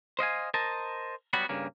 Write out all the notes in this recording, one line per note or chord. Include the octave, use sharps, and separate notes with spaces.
C5 D#5 F5 G#5
A#4 C5 D#5 A5
F#3 G3 B3 F#4
G2 C#3 A#3